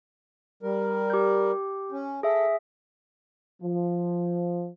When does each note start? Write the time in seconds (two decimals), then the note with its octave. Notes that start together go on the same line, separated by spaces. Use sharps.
0.63 G3 A#4
1.10 G4 G6
1.92 C#4
2.23 G#4 A4 E5
3.62 F3